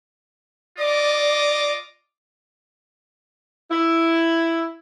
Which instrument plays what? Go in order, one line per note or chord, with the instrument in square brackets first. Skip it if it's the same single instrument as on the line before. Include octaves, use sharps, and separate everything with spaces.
[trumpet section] F4 D#5 D6 [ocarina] D5
[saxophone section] E4